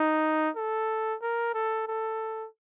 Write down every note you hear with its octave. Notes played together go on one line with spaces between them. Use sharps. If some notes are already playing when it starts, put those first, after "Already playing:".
Already playing: D#4
A4
A#4
A4
A4